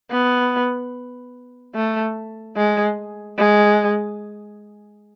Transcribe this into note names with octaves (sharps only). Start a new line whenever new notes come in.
B3
A3
G#3
G#3